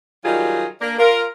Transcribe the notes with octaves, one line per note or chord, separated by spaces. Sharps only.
D#3 F#3 G3 D#4 F4 G#4
A#3 D4 A#4
F4 A#4